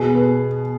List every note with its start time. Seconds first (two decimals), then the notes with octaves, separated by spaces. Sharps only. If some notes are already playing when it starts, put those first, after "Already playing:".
Already playing: B2 G#4
0.15 B3